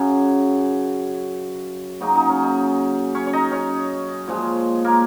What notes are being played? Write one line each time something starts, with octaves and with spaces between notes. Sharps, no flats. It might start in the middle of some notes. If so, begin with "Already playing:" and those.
Already playing: F#2 C#3 F#3
C#3 F#3 A#3 D#4
D#4
C#4
D#4
C#4 C#5
C#5
D#4 D#5
C#4 C#5
A#2 F3 G#3
A#3 A#4